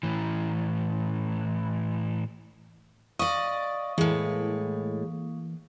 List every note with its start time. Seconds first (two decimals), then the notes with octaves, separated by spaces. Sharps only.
0.03 A2 E3
3.19 D5 D#5 F5 C#6 D#6
3.98 A2 E3 G#3 A#3